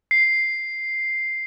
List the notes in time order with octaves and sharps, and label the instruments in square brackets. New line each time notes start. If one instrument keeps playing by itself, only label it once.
[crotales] C7